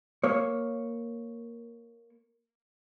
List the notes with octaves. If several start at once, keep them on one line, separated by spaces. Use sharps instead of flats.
A#3 C#5